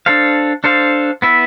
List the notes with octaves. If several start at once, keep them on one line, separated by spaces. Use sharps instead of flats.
D4 A4 C5 F5
D4 A4 C5 F5
B3 E4 B4 E5